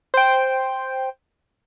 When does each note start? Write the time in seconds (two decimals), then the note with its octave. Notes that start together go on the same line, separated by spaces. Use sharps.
0.14 C5 G5